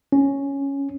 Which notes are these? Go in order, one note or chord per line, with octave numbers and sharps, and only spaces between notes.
C#4